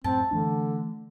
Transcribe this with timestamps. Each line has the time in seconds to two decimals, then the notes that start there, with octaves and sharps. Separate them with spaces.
0.04 F#2 A2 C4 A5
0.31 D3 E3 A3 D4